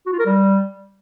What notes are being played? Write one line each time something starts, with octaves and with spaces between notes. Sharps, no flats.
F#4
F4
A#4
G3